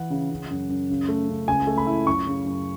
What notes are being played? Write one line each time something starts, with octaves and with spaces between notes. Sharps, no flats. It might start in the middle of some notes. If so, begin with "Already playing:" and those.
Already playing: E3 E4 F#5
C#3
C#3
F#2
F#2
C#3
A3
C#3
C#2 G#5
A3
B5
E4
F#2 C#6
C#3
F#2